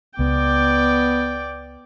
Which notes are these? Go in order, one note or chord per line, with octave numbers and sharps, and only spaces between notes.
C#2 B3 D5 G5